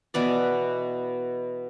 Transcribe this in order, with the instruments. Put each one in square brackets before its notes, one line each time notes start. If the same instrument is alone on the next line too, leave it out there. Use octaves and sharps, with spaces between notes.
[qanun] B2 E3 B3 D5